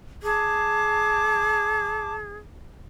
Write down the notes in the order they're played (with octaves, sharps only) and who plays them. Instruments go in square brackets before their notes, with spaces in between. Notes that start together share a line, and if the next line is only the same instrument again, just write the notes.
[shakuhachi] G#4 [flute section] A5 D6